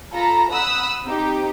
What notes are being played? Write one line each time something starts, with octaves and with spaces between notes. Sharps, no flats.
F4 A4 A#5 B5
F#5 B5 D#6 E6 F#6
C4 D#4 G4